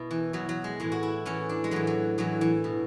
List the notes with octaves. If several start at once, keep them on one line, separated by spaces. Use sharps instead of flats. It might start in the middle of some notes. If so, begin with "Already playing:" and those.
Already playing: B2 E4
E3
B2 F#3
F#3
G#3
A2 E3 G#3
F#4
E4
A2 E3 C#4
D4
G#3
A2 E3 F#3
F#3
A2 E3 F#3
E3
B2